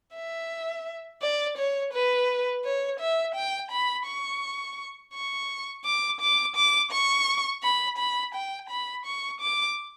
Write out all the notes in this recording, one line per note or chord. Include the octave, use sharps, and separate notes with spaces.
E5
D5
C#5
B4
C#5
E5
G5
B5
C#6
C#6
D6
D6
D6
C#6
B5
B5
G5
B5
C#6
D6